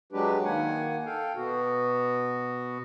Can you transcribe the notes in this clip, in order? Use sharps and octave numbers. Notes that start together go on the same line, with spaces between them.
F#3 G#3 D4 G4 B4
D#3 A#3 F#5 G#5
A4 F5 G5
B2 B3 F#4